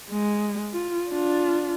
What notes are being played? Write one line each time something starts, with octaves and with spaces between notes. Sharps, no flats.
G#3
F4
D4 F4